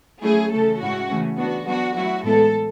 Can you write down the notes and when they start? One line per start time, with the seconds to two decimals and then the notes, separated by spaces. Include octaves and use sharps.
0.22 F#3 A3 C#4 E4 G#4
0.51 C#3 E3 A3 A4
0.80 A2 G#3 C#4 E4 F#4
1.09 C#3 E3 A3 C#4
1.38 E3 B3 D4 F#4
1.66 F#3 B3 D4 F#4
1.95 F#3 A3 E4 F#4
2.24 A2 E3 G#3 B3 E4 A4